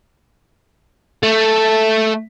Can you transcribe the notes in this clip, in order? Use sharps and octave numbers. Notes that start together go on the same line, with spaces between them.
A3